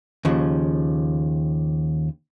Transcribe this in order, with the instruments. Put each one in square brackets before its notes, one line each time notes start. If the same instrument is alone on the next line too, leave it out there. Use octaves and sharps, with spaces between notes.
[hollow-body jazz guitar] D#2 C#3 F3